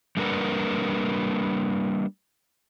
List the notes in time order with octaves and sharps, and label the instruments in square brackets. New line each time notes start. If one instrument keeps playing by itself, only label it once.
[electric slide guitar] G3 A#3 D4 A#4 B4 F#5